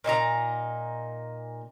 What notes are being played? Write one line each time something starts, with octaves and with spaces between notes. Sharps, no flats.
A#2 D#4 F#4 A#5